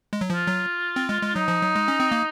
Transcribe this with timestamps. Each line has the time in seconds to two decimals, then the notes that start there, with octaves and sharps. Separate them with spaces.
0.13 G#3
0.21 F#3
0.29 F3 F4
0.47 F#3
0.96 C4
1.09 G#3
1.22 G#3
1.35 F#3 D#4
1.48 F3
1.62 F#3
1.76 G#3
1.88 C#4
2.00 C4
2.12 A#3